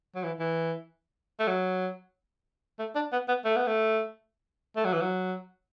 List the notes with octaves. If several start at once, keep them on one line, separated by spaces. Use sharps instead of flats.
F#3
E3
E3
A3
F#3
A3
D4
B3
B3
A3
B3
A3
A3
F#3
E3
F#3